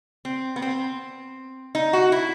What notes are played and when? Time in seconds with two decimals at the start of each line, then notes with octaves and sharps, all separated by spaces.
0.25 C4
0.56 B3
0.62 C4
1.75 D#4
1.93 F#4
2.12 E4